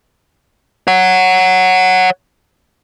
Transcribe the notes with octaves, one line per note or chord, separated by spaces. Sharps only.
C#5 F#5